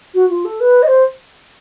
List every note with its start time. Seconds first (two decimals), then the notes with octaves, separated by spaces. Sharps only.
0.14 F#4
0.30 F4
0.45 A4
0.60 B4
0.82 D#5
0.87 C5